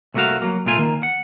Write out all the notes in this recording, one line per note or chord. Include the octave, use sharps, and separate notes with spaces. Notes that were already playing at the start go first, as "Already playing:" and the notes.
C2 A3 A#3 E4 F#4 F5
F#3 A#3
C2 A#2 A3 F4 G#5
D#3 A#3
F#5